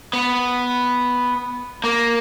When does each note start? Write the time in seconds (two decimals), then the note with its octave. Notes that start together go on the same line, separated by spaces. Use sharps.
0.13 B3
1.84 A#3